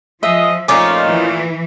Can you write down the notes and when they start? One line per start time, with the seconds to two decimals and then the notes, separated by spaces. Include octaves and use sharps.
0.23 F3 G#3 F4 D#5 E5
0.68 A#2 A3 C#4 D#4 F4 D6
1.08 E3